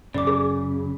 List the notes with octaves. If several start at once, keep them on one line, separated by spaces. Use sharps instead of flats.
F#2 C#3 D5 D6
G#4